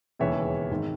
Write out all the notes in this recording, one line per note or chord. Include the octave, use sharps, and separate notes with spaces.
E1 D#2 C#3 E3 C#5 E5
G#1 D#3